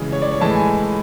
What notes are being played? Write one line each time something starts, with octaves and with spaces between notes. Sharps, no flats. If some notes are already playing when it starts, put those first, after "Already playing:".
Already playing: C#3 E3 G#3
C#5
D5
C#5
A2 E3 G#3 A5
G#5